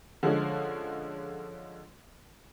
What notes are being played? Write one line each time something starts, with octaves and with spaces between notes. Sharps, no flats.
D3 F3 G#3 C#4